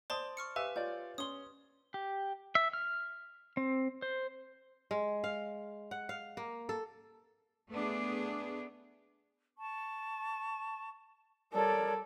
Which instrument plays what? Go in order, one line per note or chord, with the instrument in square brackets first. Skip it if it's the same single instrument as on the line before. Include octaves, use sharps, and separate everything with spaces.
[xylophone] C5 A5 C6 [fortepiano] D5 D#6
[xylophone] C#6 F6 C#7
[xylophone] G4 B4 G#5 [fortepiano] E5 F5 E6
[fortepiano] F4 C#5 D5 [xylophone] G6
[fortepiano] C#4 C6 [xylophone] D#6 G7
[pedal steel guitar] G4
E5
F6
C4
C5
[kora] G#3
F5
F#5
F5
A#3
A4
[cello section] A3 B3 D4 G#4
[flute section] A5 C#6
[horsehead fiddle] G3 A4 [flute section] A#4 C#5 D5